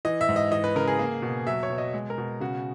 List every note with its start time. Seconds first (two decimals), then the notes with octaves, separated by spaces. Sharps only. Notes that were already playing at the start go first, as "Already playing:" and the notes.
0.05 E3 D#5
0.21 E5
0.29 G#2
0.36 D#5
0.52 E3 D#5
0.64 B4
0.75 C#3 A#4
0.88 G#4
0.99 A#3
1.22 B2
1.47 F#3 E5
1.63 C#5
1.70 B2
1.78 D#5
1.94 G#3
2.10 A#4
2.18 B2
2.40 C#3 F#4